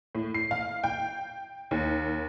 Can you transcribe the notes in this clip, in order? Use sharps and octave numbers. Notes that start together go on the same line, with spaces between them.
A2
C7
F5
G5
D#2